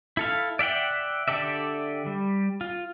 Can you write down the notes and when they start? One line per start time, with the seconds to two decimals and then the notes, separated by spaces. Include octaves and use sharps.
0.17 E4 A4 F5
0.59 D5 E5 F#5 G5
1.28 D3 G4 A4 D5 E5
2.06 G3
2.61 F4